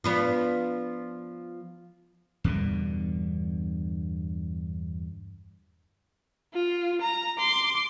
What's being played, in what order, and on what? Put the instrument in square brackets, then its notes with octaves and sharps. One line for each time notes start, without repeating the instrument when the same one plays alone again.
[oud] F3 B3 D4
[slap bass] E2 G2 B2 D3
[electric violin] F4
A#5
C6 D6